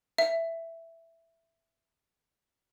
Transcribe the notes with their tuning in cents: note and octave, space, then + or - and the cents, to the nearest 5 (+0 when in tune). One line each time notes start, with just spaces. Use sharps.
E5 +5